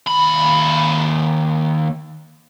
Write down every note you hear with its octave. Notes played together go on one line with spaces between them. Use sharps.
D#2 B5